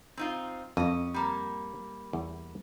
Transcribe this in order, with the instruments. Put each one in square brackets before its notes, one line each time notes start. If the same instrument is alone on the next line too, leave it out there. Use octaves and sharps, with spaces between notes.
[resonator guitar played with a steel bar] C4 D#4 F4
[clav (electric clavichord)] F2 [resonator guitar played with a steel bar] C#4 D#5
[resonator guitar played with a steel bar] G3 A#3
[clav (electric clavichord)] E2